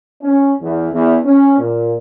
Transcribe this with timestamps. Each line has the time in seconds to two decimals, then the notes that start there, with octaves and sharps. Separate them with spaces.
0.21 C#4
0.61 E2
0.92 E2
1.24 C#4
1.58 A#2